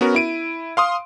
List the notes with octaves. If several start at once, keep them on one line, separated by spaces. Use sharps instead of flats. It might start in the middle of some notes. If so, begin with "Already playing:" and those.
B3 C#4 F#4 A#4
E4 D7 D#7
F5 C6 D#6